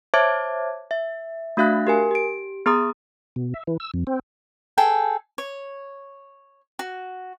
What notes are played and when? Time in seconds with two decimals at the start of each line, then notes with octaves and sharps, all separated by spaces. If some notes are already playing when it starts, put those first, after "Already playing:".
0.14 C5 C#5 E5 A5 D6 G#6
0.91 E5
1.57 A3 D4 F#4 E5 F5 F#6
1.87 G4 A#4 G#5
2.11 G4 D7
2.66 B3 G#4 A#5 D#6
3.36 B2
3.54 E5
3.67 E3
3.80 E6
3.94 F2
4.07 C4
4.78 G#4 A4 G5
5.38 C#5
6.79 F#4